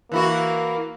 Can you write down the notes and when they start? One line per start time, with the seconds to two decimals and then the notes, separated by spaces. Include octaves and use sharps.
0.12 E3 A#3 E4 F#4